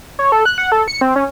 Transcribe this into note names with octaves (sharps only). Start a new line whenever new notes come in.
C#5
A4
F#6
F#5
A4
C#7
C4
C#4